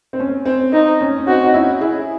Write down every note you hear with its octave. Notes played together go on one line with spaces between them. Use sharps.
C4
C#4
C4
C4 D#4
C#4
C#4
C4 D#4 F#4
D#4
C#4 E4
E4 G#4